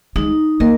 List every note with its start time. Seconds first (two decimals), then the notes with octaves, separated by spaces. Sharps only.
0.16 G#3 D#4
0.60 A#3 A#4 D#5